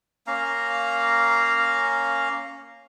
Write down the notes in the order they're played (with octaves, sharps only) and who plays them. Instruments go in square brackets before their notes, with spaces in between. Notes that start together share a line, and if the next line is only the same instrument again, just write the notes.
[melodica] A#3 C#4 F5 A#5